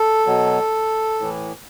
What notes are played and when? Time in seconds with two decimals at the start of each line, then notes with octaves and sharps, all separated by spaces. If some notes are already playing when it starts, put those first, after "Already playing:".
Already playing: A4
0.26 B2 F#3
1.20 A2 E3